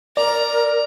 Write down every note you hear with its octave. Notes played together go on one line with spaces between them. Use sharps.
A#4 D5 A#5